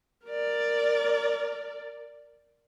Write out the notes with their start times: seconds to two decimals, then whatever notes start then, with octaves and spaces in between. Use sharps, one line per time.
0.26 A#4 D5